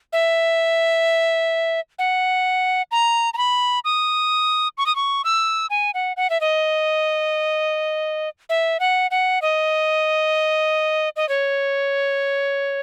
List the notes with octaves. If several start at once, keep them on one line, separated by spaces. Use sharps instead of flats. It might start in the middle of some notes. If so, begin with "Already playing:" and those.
E5
F#5
A#5
A#5
B5
D#6
C#6
D#6
C#6
E6
G#5
F#5
F#5
E5
D#5
E5
F#5
F#5
D#5
D#5
C#5